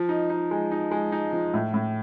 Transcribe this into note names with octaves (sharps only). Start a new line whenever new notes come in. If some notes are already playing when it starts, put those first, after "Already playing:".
Already playing: F3
D#4
D#4
G#3
D#4
G#3
D#4
F3
A2
A2